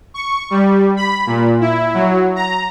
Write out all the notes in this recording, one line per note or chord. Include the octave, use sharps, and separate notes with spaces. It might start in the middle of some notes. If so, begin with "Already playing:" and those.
C#6
G3
B5
A#2
E4
F#3
A#5